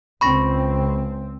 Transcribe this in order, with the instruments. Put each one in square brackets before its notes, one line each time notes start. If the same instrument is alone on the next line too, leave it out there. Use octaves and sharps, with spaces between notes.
[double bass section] C#2 C4 [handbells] B5 C#6 A#6